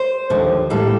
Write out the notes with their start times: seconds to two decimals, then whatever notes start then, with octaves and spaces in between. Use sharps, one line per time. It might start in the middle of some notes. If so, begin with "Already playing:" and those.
Already playing: C5
0.30 D#2 D3 F3
0.70 A2 G3 A#3 A4